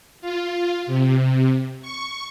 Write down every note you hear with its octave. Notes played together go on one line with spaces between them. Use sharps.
F4
C3
C#6